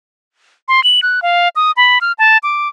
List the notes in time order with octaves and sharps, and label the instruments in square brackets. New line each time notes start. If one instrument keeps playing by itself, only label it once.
[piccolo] C6
F#7
F#6
F5
D#6
B5
F6
A5
D6